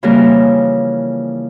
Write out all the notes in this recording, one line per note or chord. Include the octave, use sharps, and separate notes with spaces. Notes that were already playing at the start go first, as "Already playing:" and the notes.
C#3 E3 F3 G3 A#3 A#4